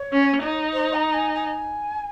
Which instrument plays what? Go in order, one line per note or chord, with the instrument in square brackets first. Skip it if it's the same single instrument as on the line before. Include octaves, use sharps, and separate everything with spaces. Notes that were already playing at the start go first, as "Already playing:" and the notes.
Already playing: [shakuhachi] C#5
[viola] C#4
D#4
[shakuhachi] C5
A#5
G#5
G#5